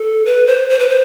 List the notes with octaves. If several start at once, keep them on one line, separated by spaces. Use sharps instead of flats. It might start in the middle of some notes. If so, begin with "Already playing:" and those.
Already playing: A4
B4
C5
C5
B4
C5